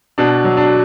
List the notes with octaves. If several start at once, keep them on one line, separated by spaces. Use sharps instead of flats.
B2 D4
F#3
D4